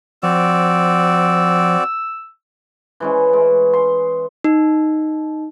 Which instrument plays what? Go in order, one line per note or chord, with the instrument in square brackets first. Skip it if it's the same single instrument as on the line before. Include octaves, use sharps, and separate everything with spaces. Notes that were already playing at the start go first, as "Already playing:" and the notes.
[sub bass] F3 [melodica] C4 F#4 D5 [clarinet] E6
[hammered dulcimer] E3 G#3 C#4
G#3
C6
[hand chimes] D#4